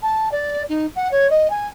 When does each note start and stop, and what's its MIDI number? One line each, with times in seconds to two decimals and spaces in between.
0.02 0.28 81
0.31 0.62 74
0.68 0.86 63
0.95 1.08 78
1.11 1.27 73
1.30 1.47 75
1.50 1.67 80